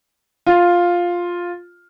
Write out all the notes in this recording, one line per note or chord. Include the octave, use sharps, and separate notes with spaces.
F4